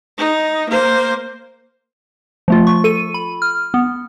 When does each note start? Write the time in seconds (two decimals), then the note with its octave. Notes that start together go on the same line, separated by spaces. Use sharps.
0.18 D#4
0.69 A#3 C5
2.48 F3 A3 F4
2.67 C#6
2.84 A4 D#7
3.14 B5
3.42 F6
3.74 B3